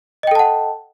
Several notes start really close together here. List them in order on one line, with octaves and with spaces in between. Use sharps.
D#5 G5 A4 A5 F#5